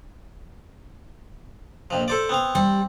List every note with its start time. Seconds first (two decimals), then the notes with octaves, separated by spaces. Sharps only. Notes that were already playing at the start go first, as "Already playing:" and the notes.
1.90 A#1 F2 F3
2.08 A4 C5 D5
2.29 B3 C4 F5
2.55 G3 C4